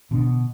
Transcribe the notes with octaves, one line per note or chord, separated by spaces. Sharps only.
B2 D3